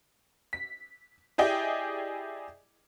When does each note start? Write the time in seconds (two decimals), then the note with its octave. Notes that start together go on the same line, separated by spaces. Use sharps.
0.53 B6
1.38 E4 G4 G#4 D5 D#5 G5